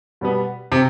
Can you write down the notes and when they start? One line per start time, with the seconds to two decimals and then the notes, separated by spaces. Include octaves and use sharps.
0.21 B2 G3 B3
0.72 C3